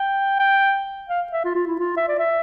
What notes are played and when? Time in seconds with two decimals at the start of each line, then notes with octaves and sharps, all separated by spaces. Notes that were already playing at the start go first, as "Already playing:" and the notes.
Already playing: G5
0.39 G5
1.09 F5
1.32 E5
1.45 F4
1.55 F4
1.67 E4
1.79 F4
1.97 E5
2.08 D5
2.19 E5